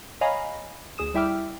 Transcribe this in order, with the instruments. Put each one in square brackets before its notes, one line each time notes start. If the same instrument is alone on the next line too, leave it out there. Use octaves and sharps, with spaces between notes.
[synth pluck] C#5 D#5 F5 G#5 A#5 B5
D2 G#4 D#6 E7
G3 E4 E5 G5 D6 F6